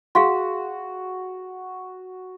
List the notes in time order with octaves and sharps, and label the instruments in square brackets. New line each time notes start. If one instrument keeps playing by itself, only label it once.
[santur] F#4 [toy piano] G#4 F5 C6